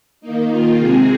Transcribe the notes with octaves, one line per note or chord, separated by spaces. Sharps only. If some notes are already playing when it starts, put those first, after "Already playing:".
D#3 A#3 D#4
D#3 A#3 F4
C3 G#3 C4 G#4